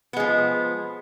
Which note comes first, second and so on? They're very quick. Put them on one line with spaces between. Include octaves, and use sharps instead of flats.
B3 G#3 F3